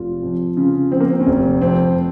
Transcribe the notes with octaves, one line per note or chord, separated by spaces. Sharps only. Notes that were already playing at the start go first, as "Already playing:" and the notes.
Already playing: F1 F4
F2
C#3 F4
F3 C4
A#3
C4
C#4
F1 C4
F2 C4